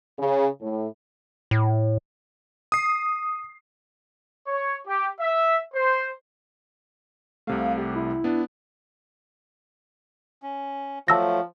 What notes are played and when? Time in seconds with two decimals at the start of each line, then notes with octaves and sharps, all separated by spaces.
0.18 C#3
0.60 A2
1.51 A2
2.72 D#6 C7
4.47 C#5
4.88 G4
5.20 E5
5.74 C5
7.47 C2 C3 A3 F5
7.78 G4
7.95 E4
8.24 B3 D4
10.42 C#4
11.08 F3 F#3 A3 A5 E6 A#6